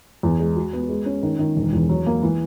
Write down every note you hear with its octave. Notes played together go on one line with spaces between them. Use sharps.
E2
G#3
F#4
B3
G#3
C#4
D#3
D#3
E1
E2
F#3
A#3
E3